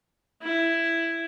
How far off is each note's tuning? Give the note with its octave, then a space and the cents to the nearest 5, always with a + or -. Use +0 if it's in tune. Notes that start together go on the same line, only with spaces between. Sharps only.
E4 +10